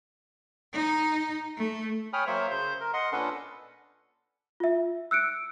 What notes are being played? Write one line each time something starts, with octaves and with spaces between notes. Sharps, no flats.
D#4
A3
C#5 G5 G#5 B5 D#6 F6
F#3 A#3 C5 C#5 E5
C#3 C5 G6
A#4
D#5 F#5 C6
A#2 C#4 D4 A4 B4 F#5
F4 E5
E6 F#6 C#7 D7